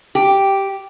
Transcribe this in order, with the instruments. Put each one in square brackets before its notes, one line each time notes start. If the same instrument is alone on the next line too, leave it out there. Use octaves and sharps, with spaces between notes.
[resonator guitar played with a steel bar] G4